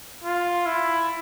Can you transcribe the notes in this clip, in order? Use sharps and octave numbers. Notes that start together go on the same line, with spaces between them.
F4
E4